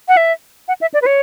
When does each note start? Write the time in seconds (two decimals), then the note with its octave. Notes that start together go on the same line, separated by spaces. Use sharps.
0.08 F#5
0.17 E5
0.68 F#5
0.81 E5
0.94 D5
1.02 B4
1.06 C#5